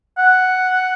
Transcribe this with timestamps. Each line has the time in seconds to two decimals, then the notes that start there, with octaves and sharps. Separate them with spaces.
0.18 F#5